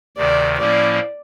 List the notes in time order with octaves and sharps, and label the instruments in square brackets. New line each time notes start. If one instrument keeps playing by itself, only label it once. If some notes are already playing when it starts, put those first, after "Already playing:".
[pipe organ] D2 C3 D#3 [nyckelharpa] D5
[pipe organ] A2 F3 A#3 C#4 E4 [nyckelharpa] D5